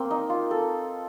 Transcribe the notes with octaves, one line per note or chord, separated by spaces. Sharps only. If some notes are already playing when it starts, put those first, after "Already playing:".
Already playing: A#3 C4
D#4
F4
A4